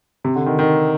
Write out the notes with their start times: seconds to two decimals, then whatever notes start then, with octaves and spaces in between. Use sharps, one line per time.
0.24 C3
0.36 D3
0.46 D#3
0.59 D#3